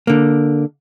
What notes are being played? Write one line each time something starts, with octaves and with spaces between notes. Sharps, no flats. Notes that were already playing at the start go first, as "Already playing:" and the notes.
D3 A#3